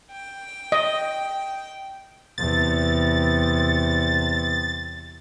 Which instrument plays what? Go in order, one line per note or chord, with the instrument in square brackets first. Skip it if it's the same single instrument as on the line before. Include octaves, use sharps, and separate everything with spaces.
[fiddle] G5
[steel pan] D#5
[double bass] E2 C3 [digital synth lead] A6